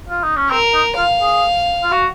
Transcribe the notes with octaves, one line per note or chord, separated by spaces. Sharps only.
F4
D#4
C#4
C4 A#4
D#4
F4 F5
G#4
F4
F#4